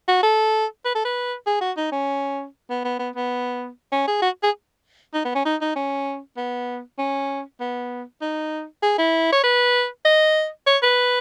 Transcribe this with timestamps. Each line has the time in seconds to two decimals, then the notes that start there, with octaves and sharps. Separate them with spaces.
0.08 F#4
0.23 A4
0.85 B4
0.95 A4
1.05 B4
1.46 G#4
1.61 F#4
1.77 D#4
1.92 C#4
2.70 B3
2.85 B3
2.99 B3
3.15 B3
3.92 C#4
4.07 G#4
4.22 F#4
4.43 G#4
5.14 D#4
5.25 B3
5.35 C#4
5.45 D#4
5.61 D#4
5.76 C#4
6.37 B3
6.98 C#4
7.60 B3
8.21 D#4
8.83 G#4
8.98 E4
9.32 C#5
9.44 B4
10.05 D#5
10.67 C#5
10.83 B4